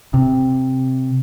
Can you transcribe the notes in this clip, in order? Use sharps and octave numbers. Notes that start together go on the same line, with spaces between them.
C3